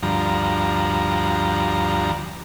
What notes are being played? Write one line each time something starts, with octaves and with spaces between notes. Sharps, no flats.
D2 G2 F3 A#5